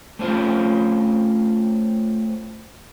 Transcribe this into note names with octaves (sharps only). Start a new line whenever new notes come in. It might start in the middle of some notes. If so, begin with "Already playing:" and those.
A3 C4 C#4 F4 G4